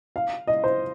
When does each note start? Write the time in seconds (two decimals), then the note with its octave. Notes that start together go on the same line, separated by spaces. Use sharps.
0.16 F5
0.47 D#5
0.64 C5